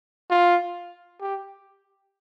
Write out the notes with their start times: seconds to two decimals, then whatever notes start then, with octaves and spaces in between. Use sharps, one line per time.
0.30 F4
1.21 G4